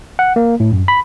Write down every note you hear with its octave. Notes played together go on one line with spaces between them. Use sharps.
F#5
A#3
A2
F#2
B5